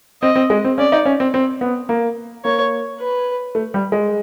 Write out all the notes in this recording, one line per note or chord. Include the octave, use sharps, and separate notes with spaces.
C4 D#5
C4
G#3
C4
C#4 D5
D#4
C#4
C4
C4
B3
A#3
A#3 C#5
B4
A3
G3
G#3